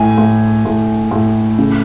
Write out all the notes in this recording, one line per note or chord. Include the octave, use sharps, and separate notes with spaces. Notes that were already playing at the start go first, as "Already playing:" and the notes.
Already playing: A2 G#5
A2
A2
A2
C#3